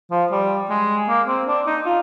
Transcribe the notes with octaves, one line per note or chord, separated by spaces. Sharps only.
F3
G3
G#3
A#3
C4
D4
D#4
F4